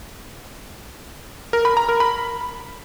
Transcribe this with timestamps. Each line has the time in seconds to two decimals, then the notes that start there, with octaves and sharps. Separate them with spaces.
1.53 A#4
1.65 B5
1.77 A#5
1.89 A#4
2.00 B5